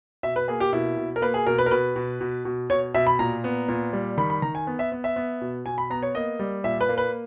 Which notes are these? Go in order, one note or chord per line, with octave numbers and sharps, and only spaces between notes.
B2 E5
B4
A#3 G#4
G4
B2 E4
B2
A#4
A#3 B4
G#4
B2 A#4
B4
A#4
B2 B4
B2
B2
B2
B2 C#5
B2 E5
B5
A#2 A#5
B3
A#2
G3
D#3 B5
B5
D#3 A#5
G#5
B3
E5
B3
E5
B3
B2
B2 G#5
B5
B3 A#5
C#5
A#3 D#5
G3
A#2 E5
B4
A#3
B4